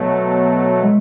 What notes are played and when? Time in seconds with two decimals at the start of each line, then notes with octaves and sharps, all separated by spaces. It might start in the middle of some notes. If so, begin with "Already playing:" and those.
Already playing: B2 F#3 A3
0.83 G#3